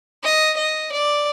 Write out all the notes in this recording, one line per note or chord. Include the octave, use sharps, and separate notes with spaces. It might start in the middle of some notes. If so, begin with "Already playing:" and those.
D#5
D#5
D5